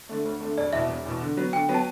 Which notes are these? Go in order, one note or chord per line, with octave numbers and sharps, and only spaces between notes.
D3 A3
D2
D3 A3
E1 D5
E2 B2 E5
E1
E2 B2
D3
F#3 B3
D3 G5
F#3 B3
A5